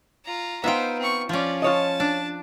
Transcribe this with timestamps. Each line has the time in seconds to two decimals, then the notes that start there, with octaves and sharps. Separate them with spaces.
0.25 F4 A#5
0.64 B3 D#4 F4 C5 E5 G5
0.99 C4 C#6
1.29 F3 C#4 F4 D5
1.62 F4 C#5 D#5 A5
2.00 D4